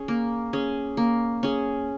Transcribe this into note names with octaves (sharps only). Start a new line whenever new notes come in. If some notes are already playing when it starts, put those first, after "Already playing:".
Already playing: C#4 G#4
A#3
C#4 G#4
A#3
C#4 G#4